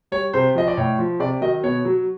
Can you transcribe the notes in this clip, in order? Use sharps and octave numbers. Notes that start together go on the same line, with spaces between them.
G3 C#5
C3 C5
F3 D#5
D5
A2 C#5
F3
C3 D5
D#3 F#3 D#5
B2 C#5
F#3